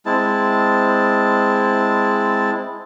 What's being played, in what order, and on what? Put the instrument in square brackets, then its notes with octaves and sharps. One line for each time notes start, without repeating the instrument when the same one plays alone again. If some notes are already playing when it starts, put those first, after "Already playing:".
[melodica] G#3 C4 E4 A5